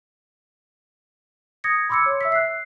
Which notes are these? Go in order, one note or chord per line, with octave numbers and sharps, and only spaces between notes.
D#6 G#6 A#6 C#7
B5 C6 D6 E6 G#6 C#7
C#5
E5 E6 B6
F#6 C7